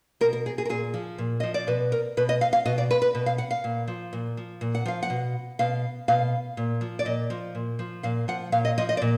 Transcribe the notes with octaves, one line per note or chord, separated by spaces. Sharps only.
B2 A#4
A#4
G#4
G#4
A#4
A#2 G#4
F3
A#2
F3 D#5
D5
B2 B4
A#4
B2 B4
D#5
F5
F5
B2 D#5
D5
B4
B4
B2
F5
F#5
F5
A#2
F3
A#2
F3
A#2
F#5
F3 F5
F#5
B2
B2 F5
B2 F5
A#2
F3
D5
A#2 D#5
F3
A#2
F3
A#2 F5
F3 F#5
A#2 F5
D#5
F3 D#5
D#5
D5
A#2